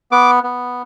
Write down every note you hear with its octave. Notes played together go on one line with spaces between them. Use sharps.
B3 D6
B3